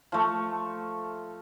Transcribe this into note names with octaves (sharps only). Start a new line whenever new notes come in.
F3 A3